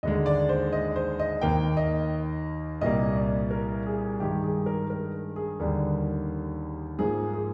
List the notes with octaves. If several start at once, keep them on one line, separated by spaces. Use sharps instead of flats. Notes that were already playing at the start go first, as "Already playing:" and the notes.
D#2 D3 G#3 D#5
D5
C5
D#5
C5
D#5
D#2 D#3 A#3 G5
D#5
C2 A#2 G3 A#3 D#5
D5
A#4
G#4
G2 D#3 G#3 G4
G#4
A#4
A#4
G#4
D#2 D3 G3 A#3
G#2 F3 A#3 G#4
G#4